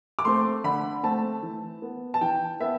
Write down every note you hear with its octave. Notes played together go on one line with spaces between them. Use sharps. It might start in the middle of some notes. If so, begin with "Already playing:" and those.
D6
A3 C4 C6
D3 B5
A3 C4 A5
E3
B3
A5
E3 G5
B3 E5